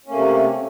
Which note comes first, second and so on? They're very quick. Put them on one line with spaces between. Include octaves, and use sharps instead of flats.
C#4 A#3 A3 C3